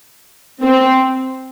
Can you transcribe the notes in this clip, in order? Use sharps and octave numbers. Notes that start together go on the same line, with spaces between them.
C4